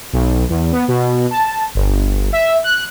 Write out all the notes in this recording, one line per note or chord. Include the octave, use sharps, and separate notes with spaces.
B1
E2
B3
B2
A5
G1
E5
F#6